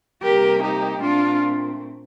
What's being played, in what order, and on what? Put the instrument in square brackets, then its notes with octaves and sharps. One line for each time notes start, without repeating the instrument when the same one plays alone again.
[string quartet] C3 G3 A#3 G4 A#4
D#4 G4
A#2 A3 C4 D4 F4